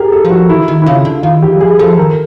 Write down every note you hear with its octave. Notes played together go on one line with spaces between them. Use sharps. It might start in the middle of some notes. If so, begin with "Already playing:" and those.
Already playing: G4 G#4 A#4
A4
F3
F#4
E3 E4
D3
D#3
E4
C#3 F4
D3
D#3 F4
E3 G4
F#3
F3 G#4
F3 A4
D#3 A#4